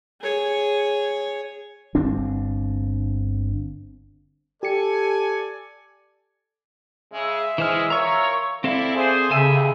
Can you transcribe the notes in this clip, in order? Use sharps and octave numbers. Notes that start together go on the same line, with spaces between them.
G#4 C#5
G1 C4 D4
G4 A4 D5 G#5 C#7
C#3 G#3 E5
E3 G#3 C5 F6
F4 A#4 C#5 A#5 C#6
C4 E4 A4 D5 F5
G#4 C5
D#2 C#3 A4 E5 G#5